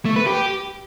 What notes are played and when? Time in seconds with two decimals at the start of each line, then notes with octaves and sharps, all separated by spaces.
0.05 A3
0.16 B4
0.27 G4